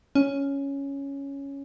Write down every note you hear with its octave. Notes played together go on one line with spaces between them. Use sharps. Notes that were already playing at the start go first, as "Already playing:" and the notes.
C#4